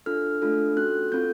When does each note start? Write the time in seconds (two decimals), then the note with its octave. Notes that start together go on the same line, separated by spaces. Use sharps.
0.06 D4 F4 A4 F6
0.42 A3 D4 F4 A4
0.77 C#4 F#4 A4 F#6
1.12 C4 F4 A4 G6